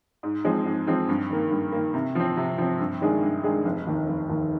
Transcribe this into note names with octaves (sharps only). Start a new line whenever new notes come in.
G#2
F3 G#3 C4
G#2
F3 G#3 C4
G2
D#3 A#3
G2
D#3 A#3
C3
F3 C4
C3
F3 C4
G2
D#3 G#3 D4 G#4
G2
D#3 G#3 D4 G#4
F1
D#2 D#3
F1
D#2 D#3